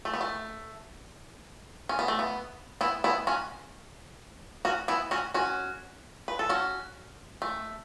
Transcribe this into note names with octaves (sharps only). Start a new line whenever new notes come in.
A3
B3
A3
C#4
B3
A3
B3
B3 E4
B3 E4
C#4 F#4
C#4 F#4
B3 E4
C#4 F#4
C#4 F#4
B4
A4
C#4 F#4
A3